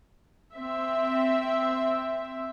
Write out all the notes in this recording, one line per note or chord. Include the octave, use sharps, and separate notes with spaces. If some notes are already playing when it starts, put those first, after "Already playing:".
C4 E5